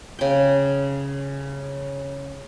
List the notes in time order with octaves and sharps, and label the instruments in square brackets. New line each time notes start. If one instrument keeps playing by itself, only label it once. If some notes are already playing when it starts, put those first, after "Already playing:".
[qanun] C#3 G5